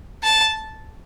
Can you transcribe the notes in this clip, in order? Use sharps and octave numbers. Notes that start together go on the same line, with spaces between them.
A5